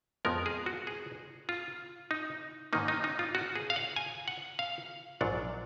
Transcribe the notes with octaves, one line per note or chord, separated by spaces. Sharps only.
F2 F3 G#3 B3 A#4
G#4
F#4
G#4
F4
D#4
G#2 D#3 A#3 D#4
D#4
D#4
F4
F#4
G#4
F5
F#5
G#5
F#5
F5
A#1 G#2 F#3 D4 F#5